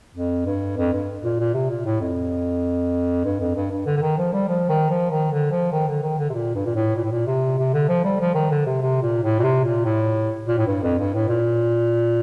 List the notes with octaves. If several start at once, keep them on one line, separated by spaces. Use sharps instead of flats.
F2
G2
F2
G2
A#2
A#2
C3
A#2
A2
F2
G2
F2
G2
G2
D3
D3
D#3
F3
G3
F3
D#3
F3
D#3
D3
F3
D#3
D3
D#3
D3
C3
A#2
G2
A#2
A2
A#2
A2
A#2
C3
C3
D3
F3
G3
F3
D#3
D3
C3
C3
A#2
A2
A#2
C3
A#2
A2
A#2
A2
G2
F2
G2
A2
A#2